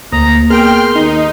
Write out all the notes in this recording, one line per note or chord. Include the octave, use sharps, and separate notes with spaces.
D2 A#3 A#5 D#6
B3 G#4 A#4 G5 C6 F6
D#2 D#4